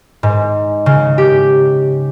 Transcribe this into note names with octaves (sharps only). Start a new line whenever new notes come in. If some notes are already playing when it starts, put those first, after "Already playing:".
G#2
C#3
G4